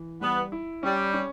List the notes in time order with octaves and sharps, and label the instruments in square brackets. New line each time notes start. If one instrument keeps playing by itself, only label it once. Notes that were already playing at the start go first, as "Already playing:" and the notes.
Already playing: [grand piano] E3
[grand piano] G3 [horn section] B3
[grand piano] E4
[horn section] G3 [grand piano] C#4
[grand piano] C#4